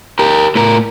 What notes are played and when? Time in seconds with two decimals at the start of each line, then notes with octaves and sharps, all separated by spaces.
0.19 G4 A#4
0.55 A2 A#4